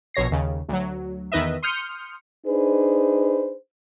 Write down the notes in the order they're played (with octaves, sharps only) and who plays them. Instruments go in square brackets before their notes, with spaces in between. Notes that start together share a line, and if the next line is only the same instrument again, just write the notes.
[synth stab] A#1 B2 C#5 A#6 C7
D#2 C#3
D2 F#3
E2 D#3 B4 D#5 E5
C6 D#6 F6 G6 C#7
[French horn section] D4 D#4 G#4 B4 C5